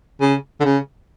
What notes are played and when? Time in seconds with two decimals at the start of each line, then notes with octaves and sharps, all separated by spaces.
0.21 C#3
0.60 D3
0.64 C#3